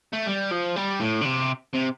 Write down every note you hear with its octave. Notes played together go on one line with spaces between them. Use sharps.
A3
G3
F3
G3
A2
D3
C3
C3